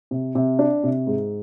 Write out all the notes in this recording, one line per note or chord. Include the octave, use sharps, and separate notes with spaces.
C3
C3
D4
C3
G#2